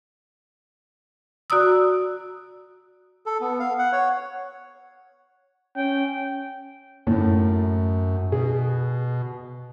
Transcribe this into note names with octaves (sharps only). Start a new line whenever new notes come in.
F#4 D5 A#5 D#6 E6
A4
B3
F5
F#5
C#5
C#4 G5
F#2 A2
B2 G#4